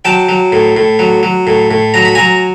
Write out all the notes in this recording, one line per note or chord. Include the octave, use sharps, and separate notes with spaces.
F#3 G5 A5
F#3
A2
A2
F#3
F#3
A2
A2
F#3 A#5
B5
F#3 G#5 A#5